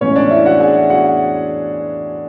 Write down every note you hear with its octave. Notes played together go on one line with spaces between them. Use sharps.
A2 E3 G#3 C#4 C#5
D4 D5
E4 E5
F#4 F#5
G#4 G#5
F#4 F#5